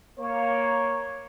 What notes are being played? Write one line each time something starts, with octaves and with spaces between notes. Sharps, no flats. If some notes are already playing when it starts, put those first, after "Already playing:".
A#3 C#5